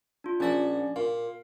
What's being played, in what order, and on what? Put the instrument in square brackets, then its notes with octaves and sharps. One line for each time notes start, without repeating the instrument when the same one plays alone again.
[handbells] D4 F4
[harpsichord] A#1 F#5 [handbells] C#4 D4 D5
[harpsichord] A#2 [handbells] F5